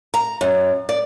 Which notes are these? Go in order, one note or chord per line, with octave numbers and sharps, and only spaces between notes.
A#5
F#2
D5